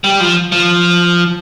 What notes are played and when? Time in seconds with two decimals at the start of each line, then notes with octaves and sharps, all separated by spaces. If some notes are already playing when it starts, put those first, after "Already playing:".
0.04 G3
0.20 F3
0.52 F3